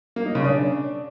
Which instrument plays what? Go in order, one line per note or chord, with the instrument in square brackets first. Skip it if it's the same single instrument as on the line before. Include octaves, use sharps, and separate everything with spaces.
[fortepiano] A#3
D#4
C#3
D4